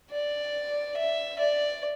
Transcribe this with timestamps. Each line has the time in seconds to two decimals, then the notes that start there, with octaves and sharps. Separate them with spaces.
0.11 D5
0.97 E5
1.39 D5